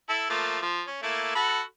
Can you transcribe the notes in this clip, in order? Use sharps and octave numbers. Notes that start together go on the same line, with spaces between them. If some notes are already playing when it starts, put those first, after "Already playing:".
E4 A4
F3 A3 A#3
F3
C#4
A3 A#3 E4
F#4 A4 B5